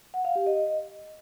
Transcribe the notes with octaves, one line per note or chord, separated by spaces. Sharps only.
F#5
F5
G4
D#5